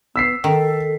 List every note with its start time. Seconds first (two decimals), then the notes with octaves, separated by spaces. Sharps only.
0.16 B3 E6 B6 C7
0.44 D#3 A4